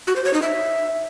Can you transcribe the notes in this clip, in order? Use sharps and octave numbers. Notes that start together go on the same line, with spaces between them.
F#4
C5
C#5
D#4
E5